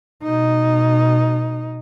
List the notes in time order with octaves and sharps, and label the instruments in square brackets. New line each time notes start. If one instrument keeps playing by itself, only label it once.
[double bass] B2 D#4